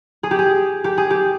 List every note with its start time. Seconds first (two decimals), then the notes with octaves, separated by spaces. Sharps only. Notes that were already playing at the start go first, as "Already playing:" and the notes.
0.23 G#4
0.31 G4
0.39 G#4
0.84 G4
0.98 G#4
1.10 G4